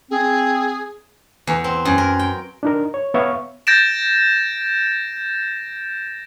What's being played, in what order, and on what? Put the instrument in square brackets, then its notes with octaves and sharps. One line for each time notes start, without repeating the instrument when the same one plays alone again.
[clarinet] C4 [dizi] G#4
[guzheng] E2
C4
F#2
A#4
G5
[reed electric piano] D4 D#4 A#4
C#5
B3 C#5 E5 F5 C#6
[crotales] G6 A6 A#6 D7 E7